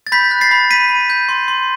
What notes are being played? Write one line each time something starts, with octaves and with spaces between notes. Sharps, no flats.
A6
B5 G6 B6
F#6
A6 C7
B5
B5 B6 D#7
B5
G6
C6
C6